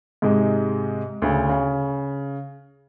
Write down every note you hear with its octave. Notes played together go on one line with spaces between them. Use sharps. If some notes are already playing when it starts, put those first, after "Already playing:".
G#2 C3 G#3
D2 C#3
C#3